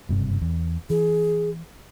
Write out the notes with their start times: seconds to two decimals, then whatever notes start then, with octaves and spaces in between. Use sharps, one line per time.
0.09 F#1 G2 C3
0.41 E2
0.90 E3 G#4